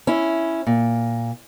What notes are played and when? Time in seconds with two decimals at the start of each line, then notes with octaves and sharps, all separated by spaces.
0.07 C#4 E4
0.67 A#2